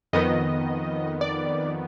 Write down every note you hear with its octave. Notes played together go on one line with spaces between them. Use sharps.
F2 D#3 B3 D#5
D5